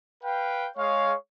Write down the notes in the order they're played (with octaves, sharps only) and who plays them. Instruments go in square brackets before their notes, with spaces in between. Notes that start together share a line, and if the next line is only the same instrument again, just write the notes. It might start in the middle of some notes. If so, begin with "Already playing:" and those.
[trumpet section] B4 F5 G5
[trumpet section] G#3 G#4 F5 [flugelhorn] C#5